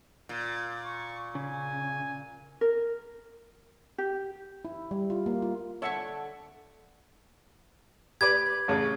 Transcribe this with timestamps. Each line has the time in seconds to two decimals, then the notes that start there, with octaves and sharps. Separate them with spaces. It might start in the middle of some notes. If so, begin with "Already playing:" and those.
0.29 A#2
0.85 C#6
1.35 C#3 G#5
2.61 A#4
3.98 G4
4.65 E4
4.91 G3
5.10 F4
5.26 A#3
5.42 F4
5.82 D3 A4 C#5 E5 F#5 A5 C#6
8.21 G4 B4 D5 G#6
8.68 A1 C#3